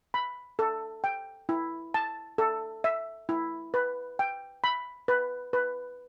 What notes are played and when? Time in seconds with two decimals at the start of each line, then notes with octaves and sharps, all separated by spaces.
0.14 B5
0.59 A4
1.04 G5
1.49 E4
1.94 A5
2.38 A4
2.84 E5
3.29 E4
3.74 B4
4.19 G5
4.64 B5
5.08 B4
5.53 B4